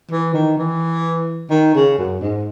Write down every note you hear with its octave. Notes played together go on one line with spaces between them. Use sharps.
E3
D#3
E3
D#3
C#3
F#2
G#2